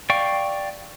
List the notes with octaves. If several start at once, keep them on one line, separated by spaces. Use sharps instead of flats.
D5 F5 G5 C#6